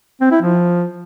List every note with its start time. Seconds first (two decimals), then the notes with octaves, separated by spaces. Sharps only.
0.21 C4
0.31 E4
0.42 F3